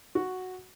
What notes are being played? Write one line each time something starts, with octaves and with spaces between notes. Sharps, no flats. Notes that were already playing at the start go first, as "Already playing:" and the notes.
F#4